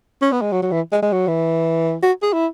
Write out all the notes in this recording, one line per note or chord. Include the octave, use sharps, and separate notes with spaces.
C#4
B3
G#3
F#3
F#3
E3
G#3
G#3
F#3
E3
F#4
G#4
E4